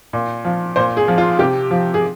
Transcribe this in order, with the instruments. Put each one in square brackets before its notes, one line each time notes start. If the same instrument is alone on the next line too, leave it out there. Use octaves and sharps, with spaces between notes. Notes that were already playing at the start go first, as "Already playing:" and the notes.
[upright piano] A#2
F3
A#2 C5
G#4
F3
F4
C3 G4
F3
G#4